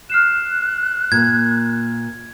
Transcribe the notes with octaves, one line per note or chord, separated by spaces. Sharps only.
F6 F#6 C7 E7
A#2 A#3 G#6